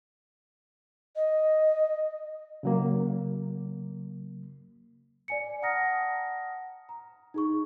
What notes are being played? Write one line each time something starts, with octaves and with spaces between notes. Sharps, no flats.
D#5
C#3 F#3 A#3
D5 G#5 C#7
F#5 A5 A#5 D#6 F6 A#6
A#5
D#4 G#4 C#6